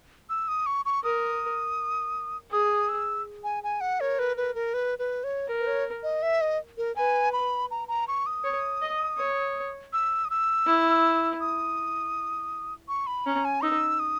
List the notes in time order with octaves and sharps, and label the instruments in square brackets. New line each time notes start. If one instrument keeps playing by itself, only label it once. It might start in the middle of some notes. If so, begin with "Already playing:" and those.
[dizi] E6
D#6
C#6
C#6
[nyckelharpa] A#4 [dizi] D#6
[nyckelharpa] G#4 [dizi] D#6
[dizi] E6
G#5
G#5
F#5
[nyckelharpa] A#4 [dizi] C#5
[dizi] B4
B4
A#4
B4
B4
C#5
[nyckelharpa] A#4
[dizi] B4
C#5
D#5
E5
D#5
A#4
[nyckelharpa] B4 [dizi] G#5
[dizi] B5
A#5
A#5
C#6
D#6
[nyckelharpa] C#5
D#5
C#5
[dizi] E6
D#6
E6
[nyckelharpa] E4
[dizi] D#6
C#6
B5
[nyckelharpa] C#4 [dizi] A#5
[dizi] G#5
[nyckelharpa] D#4 [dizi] E6
[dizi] D#6